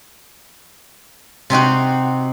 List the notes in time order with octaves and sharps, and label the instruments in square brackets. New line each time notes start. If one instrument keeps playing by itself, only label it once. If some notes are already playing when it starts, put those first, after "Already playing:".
[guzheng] C3 C4 D#4 F#4